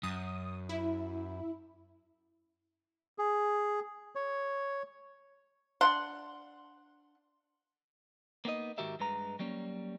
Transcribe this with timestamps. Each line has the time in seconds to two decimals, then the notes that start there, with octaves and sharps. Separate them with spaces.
0.03 F#2 D#6
0.69 E4
3.18 G#4
4.15 C#5
5.81 D4 F#5 C6
8.45 A#3 B3 D#4 D#5
8.78 G#2 D#3 F#4 G4 A#4 E5
9.00 G2 G#3 B4 A#5
9.39 F#3 G3 A#3 C#4